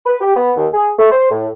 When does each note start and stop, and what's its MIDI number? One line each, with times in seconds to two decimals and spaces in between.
0.06 0.16 71
0.21 0.34 67
0.36 0.52 59
0.57 0.68 39
0.74 0.91 68
0.99 1.10 57
1.12 1.29 72
1.31 1.48 45